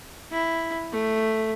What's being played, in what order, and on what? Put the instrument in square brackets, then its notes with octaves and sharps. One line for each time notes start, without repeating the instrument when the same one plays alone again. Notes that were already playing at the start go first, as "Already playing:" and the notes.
[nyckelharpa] E4
A3